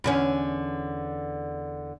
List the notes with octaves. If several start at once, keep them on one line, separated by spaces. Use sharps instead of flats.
E2 D3 C#4